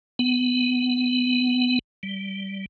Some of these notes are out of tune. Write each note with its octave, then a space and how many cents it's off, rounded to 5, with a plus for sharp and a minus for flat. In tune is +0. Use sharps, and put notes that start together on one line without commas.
B3 +20
G3 -10